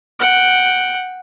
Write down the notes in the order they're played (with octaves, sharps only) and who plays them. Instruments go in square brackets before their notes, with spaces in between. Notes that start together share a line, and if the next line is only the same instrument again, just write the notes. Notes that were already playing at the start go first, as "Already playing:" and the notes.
[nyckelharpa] F#5 G5